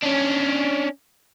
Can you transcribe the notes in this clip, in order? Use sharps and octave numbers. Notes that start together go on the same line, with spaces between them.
C#4 D4